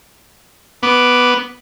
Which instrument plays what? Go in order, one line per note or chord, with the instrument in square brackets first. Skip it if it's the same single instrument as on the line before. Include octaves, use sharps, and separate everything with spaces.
[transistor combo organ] B3 [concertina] D6